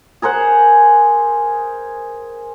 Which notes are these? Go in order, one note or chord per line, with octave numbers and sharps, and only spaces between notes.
G#4 A#4 C5 F#5